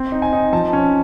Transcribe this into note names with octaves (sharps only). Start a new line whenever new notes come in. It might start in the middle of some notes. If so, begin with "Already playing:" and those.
Already playing: C4
D#4
G#5
D#4
F3 A5
C#4